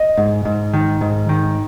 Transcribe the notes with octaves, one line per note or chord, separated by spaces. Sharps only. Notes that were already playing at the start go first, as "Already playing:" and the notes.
Already playing: D#5
G#2
G#2
D#3
G#2
D#3